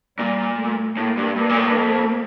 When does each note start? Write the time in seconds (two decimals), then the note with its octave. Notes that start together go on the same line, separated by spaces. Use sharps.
0.19 A#2 G3
0.58 A3
0.97 A2 A#3
1.17 G2
1.36 G2 A#3
1.49 A#2
1.57 A2
1.67 G2
1.76 F2